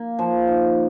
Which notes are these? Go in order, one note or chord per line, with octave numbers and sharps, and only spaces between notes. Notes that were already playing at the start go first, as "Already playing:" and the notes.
Already playing: A#3
F3
D#4